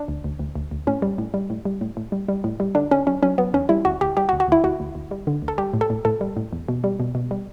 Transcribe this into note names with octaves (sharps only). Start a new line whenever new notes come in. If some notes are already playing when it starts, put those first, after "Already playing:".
Already playing: D4
D2
D2
D2
D2
D2
A2 C#4
G3
A2
G3
A2
G3
A2
A2
G3
G3
A2
G3
D3 D4
D3 C#4
F#3 C#4
F#3 C#4
F#3 B3
E2 C#4
G3 E4
D2 F#4
D2 G4
G3 G4
F#4
D2
F#4
D2 E4
D2 F#4
D2
D2
G3
D3
D2
A4
G3 G4
A2
A4
A2
A2 A4
G3
A2
E2
B2
G3
B2
B2
G3